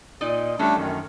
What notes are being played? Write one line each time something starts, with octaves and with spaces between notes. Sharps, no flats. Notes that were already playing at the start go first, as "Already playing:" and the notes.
A#2 D#4 D5 D#5
E3 G3 A3 C#4 D4 A4
F#2 D#3